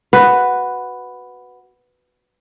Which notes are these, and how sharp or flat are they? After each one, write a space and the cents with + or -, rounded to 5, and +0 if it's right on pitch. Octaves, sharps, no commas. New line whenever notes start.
F#4 +0 B4 +5